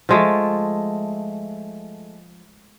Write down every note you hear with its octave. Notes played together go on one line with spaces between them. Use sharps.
F3 G#3 A3